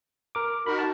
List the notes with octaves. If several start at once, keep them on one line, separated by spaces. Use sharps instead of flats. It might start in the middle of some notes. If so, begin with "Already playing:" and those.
A#4 D6
D#4 F#4 A#4 B5
A5